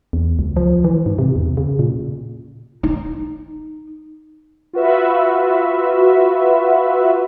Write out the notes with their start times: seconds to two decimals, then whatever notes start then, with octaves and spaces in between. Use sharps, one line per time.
0.13 E2
0.39 C#2
0.56 F3
0.84 E3
1.06 G#2
1.19 C3
1.36 E2
1.57 C#3
1.79 A#2
2.83 D#4
4.73 F4 F#4 B4 E5